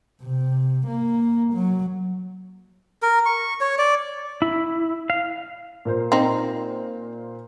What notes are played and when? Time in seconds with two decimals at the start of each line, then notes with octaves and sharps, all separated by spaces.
0.22 C3
0.87 A#3
1.54 F#3
3.03 A#4
3.26 C#6
3.61 C#5
3.78 D5
4.42 E4
5.10 F5
5.85 A#2 A#4 C5
6.12 C4 D#4